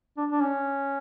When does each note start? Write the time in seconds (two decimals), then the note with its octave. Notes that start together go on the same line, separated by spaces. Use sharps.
0.17 D4
0.31 D4
0.41 C#4